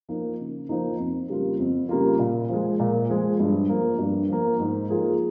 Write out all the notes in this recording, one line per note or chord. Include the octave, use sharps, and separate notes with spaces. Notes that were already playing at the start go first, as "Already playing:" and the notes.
F3 A#3 D#4
C#3
F3 A#3 D#4
F2
C#3 G3 A#3 F4
F2
C#3 G3 A#3 F4
A#2
F3 G#3
A#2
F3 G#3
G2
F3 A#3
G2
F3 A#3
G#2
F3 A#3 F4 G#4